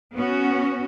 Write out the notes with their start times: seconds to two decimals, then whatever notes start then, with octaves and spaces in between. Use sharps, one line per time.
0.14 B3 C#4 F#4